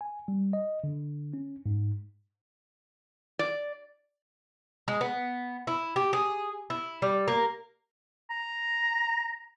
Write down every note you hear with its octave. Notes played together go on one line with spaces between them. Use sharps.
G#5
G3
D#5
D3
C#4
G#2
D5
G#3
B3
E4
G4
G#4
E4
G3
A#3
A#5